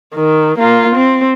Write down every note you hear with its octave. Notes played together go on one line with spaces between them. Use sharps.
D#3
A#3 F4
C4